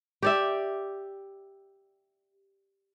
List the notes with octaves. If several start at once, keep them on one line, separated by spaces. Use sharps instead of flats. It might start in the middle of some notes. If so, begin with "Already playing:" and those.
G4 D5 E5